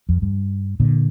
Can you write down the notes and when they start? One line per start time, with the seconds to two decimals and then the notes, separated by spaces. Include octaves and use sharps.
0.09 F2
0.22 G2
0.80 A#2 D3